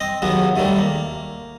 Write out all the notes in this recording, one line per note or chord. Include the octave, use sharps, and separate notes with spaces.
C4 D#5
D#2 C#3 F#3 G#3 B3
D#2 C3 D#3 G3 A3
A#3